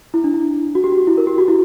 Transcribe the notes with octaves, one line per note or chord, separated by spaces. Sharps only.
E4
D4
E4
F#4
G4
F#4
E4
A#4
G4
F#4
E4